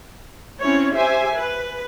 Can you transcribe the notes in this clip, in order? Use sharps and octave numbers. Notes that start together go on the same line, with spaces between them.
C4 C#4 E4 C#5
G4 C5 E5 G#5
B4